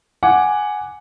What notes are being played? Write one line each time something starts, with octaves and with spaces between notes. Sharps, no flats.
F#5 G#5 D6